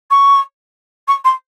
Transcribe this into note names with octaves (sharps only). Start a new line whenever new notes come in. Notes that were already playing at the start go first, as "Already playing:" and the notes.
C#6
C#6
C6